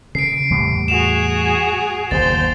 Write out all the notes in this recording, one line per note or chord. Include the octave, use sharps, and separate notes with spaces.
C#3 C7 D7
E2 A2 G3
F#4 G#4 E7 F7
F#1 D#2 B2 C5 A6